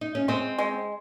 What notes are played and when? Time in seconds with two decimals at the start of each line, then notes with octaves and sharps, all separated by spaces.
0.01 D#4
0.15 C#4
0.28 G#3 C4
0.58 G#3